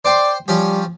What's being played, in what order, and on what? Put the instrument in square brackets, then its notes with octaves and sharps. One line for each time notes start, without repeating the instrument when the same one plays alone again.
[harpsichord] C5 G5 C6 [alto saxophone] D5
[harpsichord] F3 C#4 G4 [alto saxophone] G3